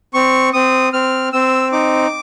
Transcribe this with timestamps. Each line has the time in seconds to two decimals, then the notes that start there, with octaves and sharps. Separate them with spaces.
0.14 C4 C#6
0.53 C4 D#6
0.93 C4 F6
1.33 C4 E6
1.72 D#4 D6